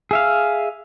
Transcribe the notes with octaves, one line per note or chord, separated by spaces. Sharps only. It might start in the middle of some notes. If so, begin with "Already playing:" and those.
G#4 E5 F5